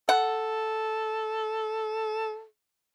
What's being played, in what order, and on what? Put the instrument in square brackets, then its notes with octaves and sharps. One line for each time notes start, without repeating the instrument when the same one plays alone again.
[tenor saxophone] A4 [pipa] F#5